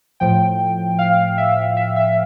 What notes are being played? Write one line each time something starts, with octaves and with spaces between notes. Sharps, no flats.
A2 F3 G5
F5
E5
E5
E5